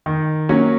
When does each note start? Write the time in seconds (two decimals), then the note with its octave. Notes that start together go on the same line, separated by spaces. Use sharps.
0.06 D#3
0.49 F#3 A#3 C#4 F#4